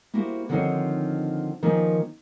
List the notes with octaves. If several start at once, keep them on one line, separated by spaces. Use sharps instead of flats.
A#3 E4 F#4 G4 C5
D3 D#3 F3 C4 D#4 C#5
D#3 F3 A#3 C#4 D#4